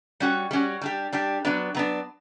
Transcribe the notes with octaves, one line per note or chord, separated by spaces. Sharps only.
G3 C#4 F#4
G3 C#4 F#4
G3 D4 G4
G3 D4 G4
F#3 B3 D4
F#3 B3 D4